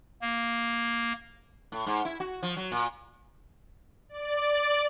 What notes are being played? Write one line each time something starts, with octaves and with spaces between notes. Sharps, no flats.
A#3
A2
G#2
E4
F#4
F3
F#3
A#2
D5